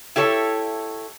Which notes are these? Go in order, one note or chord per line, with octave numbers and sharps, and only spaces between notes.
E4 G4 A4 C#5